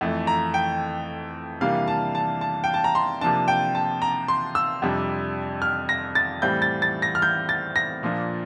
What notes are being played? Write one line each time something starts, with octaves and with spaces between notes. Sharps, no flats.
F2 E3 A3
A#5
G5
C3 E3 G3 A#3 D4 F5
A5
A5
A5
G5
A5
A#5
C6
C3 F3 A#3 D4 A5
G5
A5
A#5
C6
E6
F2 C3 G3 D4
F6
A#6
A6
A2 E3 G3 C4 G6
A6
A6
A#6
F6
G6
A6
A#6
A#2 F3 A#3 D4